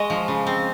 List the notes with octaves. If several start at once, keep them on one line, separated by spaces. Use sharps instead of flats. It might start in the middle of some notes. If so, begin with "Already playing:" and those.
Already playing: G#3 C#5 D#5
F3
C#3
C4